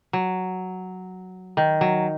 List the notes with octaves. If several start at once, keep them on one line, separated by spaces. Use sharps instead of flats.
F#3
D#3
F#3